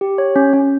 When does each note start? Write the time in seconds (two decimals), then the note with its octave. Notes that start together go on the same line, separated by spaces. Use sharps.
0.01 G4
0.18 C#5
0.36 C#4
0.53 C#4